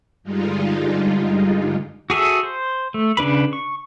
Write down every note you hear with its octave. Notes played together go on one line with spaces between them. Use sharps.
G2 D3 G3 G#3 D#4 F4
F#4 G#4 A4 E5
C5
A3
C#3 D4 B4 B5
C#6